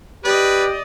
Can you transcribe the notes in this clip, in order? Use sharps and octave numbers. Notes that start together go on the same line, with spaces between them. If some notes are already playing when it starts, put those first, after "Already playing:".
G4 B4 D5 D#5